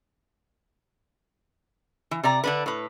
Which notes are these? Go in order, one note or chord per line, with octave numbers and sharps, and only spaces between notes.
E3
C3 D5 A#5
D3 D4 B4
A2 B4